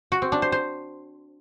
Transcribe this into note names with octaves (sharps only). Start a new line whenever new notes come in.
F#4
C4
D4
C5
C5